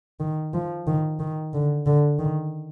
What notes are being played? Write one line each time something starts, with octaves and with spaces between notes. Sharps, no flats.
D#3
F3
D#3
D#3
D3
D3
D#3